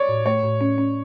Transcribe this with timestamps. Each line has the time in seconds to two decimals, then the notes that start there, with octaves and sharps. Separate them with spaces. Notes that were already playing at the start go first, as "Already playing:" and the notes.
Already playing: C#5 D5
0.09 A2
0.26 A3 C#5
0.43 A2
0.61 C#4
0.78 C#4